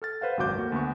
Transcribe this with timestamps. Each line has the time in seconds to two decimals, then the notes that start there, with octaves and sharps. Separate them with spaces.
0.02 A4 F6 A6
0.21 B4 C5 F5 F#5
0.37 G#1 C#2 F#2 F#4 D6 G6
0.55 A3 A#3 F#4
0.72 D2 B3 C#6